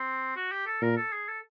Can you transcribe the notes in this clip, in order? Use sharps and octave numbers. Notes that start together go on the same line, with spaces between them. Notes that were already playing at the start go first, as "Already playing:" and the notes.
Already playing: C4
F#4
G4
A4
A#2 A#4
A4
G#4
A4